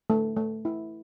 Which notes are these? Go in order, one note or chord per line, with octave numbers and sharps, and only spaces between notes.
A3
A3
E4